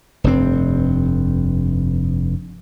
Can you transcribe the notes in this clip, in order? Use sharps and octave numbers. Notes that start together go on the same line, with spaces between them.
F1 G2 C4